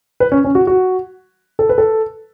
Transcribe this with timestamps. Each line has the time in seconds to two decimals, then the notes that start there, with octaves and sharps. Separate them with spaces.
0.20 B4
0.32 C#4
0.44 C#4
0.55 F#4
0.67 F#4
1.59 A4
1.69 B4
1.78 A4